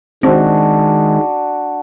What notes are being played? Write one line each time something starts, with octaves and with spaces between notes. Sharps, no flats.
D#3 G#3 C4 D4 F#4